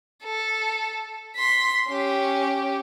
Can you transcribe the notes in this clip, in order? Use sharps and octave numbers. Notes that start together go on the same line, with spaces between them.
A4
C6 B6
C#4 G4